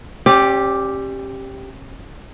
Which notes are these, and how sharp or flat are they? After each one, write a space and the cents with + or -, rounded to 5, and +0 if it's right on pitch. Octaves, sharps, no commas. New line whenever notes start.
C#4 -40 G4 +0 D5 +0